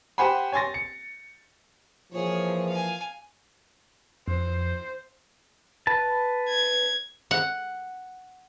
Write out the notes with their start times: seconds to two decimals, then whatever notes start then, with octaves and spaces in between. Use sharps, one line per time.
0.18 G4 C5 F#5 G#5 B5
0.52 C#5 G#5 C6 A6 A#6
0.74 C#7
2.12 A#2 E3 F3 G#4 C#5
2.69 F5 G#5
4.28 F2 C5
5.87 B4 A5
6.49 G#6
7.31 F#5